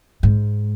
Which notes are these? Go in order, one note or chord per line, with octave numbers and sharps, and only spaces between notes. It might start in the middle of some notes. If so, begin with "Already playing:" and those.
G#2